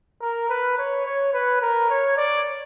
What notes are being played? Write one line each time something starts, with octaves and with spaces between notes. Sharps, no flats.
A#4
B4
C#5
C#5
B4
A#4
C#5
D5